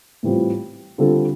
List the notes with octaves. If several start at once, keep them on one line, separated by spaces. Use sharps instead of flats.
A2 E3 G3 C4 F4
D3 G3 C4 F4 A4